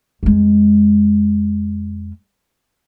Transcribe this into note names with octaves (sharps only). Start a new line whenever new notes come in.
F2 G#3